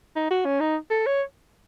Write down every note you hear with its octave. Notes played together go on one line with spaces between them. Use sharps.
D#4
F#4
C#4
D#4
A4
C#5